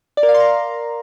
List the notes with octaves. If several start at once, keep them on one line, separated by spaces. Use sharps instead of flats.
D5
A#4
F5
C6
A#5